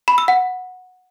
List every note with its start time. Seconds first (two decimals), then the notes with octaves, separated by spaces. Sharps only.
0.08 B5
0.18 E6
0.28 F#5